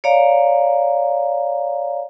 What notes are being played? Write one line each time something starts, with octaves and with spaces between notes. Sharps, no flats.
C#5 D5 F5 A#5